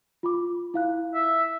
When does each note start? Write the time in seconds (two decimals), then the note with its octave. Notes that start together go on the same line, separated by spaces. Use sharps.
0.23 F4 B5 D6
0.74 E4 F5 F#6
1.15 E5